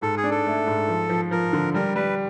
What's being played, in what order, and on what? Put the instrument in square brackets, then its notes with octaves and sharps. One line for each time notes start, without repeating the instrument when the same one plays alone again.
[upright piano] G#2 [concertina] A4
[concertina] G#4
[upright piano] D4
[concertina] A4
[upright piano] A3
G#2
F3
F3
[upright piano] F3 [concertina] A#4
[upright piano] D3
[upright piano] G3 [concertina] A#4
[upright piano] G3 [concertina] B4